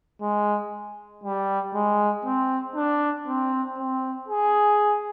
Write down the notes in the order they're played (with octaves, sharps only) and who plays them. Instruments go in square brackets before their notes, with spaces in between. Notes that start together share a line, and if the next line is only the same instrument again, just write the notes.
[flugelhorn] G#3
G3
G#3
C4
D4
C4
C4
G#4